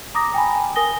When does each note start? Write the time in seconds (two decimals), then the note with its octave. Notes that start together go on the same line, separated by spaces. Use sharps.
0.15 A#5 D6 D#6 A#6
0.34 G5 G#5 B5
0.76 A#4 G#5 D#6 A#6 G7